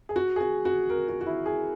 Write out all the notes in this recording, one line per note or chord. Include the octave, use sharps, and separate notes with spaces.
G#4
F#4
G#4
F#4
F#4
A#4
F#4
F#4
E4
G#4